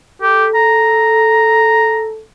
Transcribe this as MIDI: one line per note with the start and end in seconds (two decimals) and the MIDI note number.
0.22 0.46 67
0.22 2.21 69
0.55 2.08 82